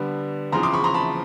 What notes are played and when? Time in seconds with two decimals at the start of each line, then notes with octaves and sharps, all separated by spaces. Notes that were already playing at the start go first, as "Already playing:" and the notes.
Already playing: D3 G3 B3 D4
0.52 E2 C#3 F3 A#5 C6
0.63 C6 D6
0.73 B5 C#6
0.84 A#5 C6
0.94 A5 B5